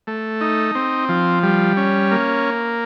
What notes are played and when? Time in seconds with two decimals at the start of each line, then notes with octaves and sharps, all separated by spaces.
0.07 A3
0.41 D#4
0.75 C4
1.09 F3
1.43 G3
1.77 C#4
2.11 A#3